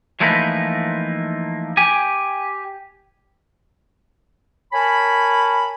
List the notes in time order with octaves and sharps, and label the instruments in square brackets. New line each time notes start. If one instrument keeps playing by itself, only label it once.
[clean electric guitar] E3 F3 A3 A#3 D#4 B4
G4 G#5
[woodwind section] A#4 C#5 G#5 A5 B5